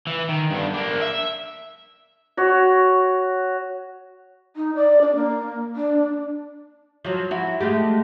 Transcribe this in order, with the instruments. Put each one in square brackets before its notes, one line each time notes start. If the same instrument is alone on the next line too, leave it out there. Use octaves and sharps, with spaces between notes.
[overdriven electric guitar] E3
D#3
G2 D3
A#3 D4
E5
[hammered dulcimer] F#4 C#5
[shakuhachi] D#4
D5
D4
A#3
D4
[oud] F3 F#3
E4 F#4
G#3 A3 G4